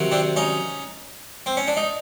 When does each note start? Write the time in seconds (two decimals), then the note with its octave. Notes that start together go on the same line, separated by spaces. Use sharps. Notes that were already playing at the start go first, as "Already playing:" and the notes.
Already playing: C3 D#3 F#3
0.11 C4 D4
0.36 C#4 D#4
1.46 C4
1.57 C#4
1.67 D4
1.77 D#4